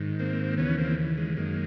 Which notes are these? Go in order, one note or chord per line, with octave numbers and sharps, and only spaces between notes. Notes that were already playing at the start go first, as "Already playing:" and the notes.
Already playing: G#2 D#3
A#3 C4
D#2 C#3 E3 B3 C#4
A#3 C4
G#3
F#2 D#3 G#3 A#3